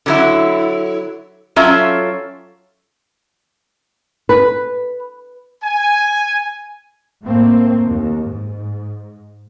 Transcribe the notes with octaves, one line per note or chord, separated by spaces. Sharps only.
D3 F#3 E4
F#3 C#4 F4 A4 D5 E5
B4
G#5
A2 A3 A#3 C4
D#2
G#2